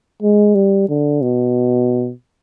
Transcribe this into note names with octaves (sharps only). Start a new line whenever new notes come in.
G#3
G3
D3
B2